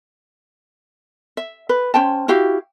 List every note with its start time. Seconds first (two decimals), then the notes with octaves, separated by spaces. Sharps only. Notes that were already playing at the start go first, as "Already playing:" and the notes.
1.37 E5
1.69 B4
1.94 C#4 C5 G5 A5
2.28 E4 F#4 G4 F5